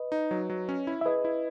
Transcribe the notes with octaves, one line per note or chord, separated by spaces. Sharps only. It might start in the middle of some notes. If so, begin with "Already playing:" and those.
Already playing: B4 D#5
D#4
F#3
F#3
C#4
E4
E5
G#4 B4 D#5
E4